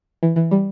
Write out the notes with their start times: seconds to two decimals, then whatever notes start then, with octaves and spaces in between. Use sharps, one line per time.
0.23 E3
0.36 E3
0.51 G3